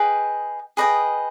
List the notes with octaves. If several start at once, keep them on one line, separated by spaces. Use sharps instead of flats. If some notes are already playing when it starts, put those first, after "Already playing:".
Already playing: G#4 B4 D#5 G5
G#4 B4 D#5 G5